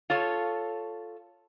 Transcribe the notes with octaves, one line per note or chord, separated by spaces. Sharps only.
F4 A4 C#5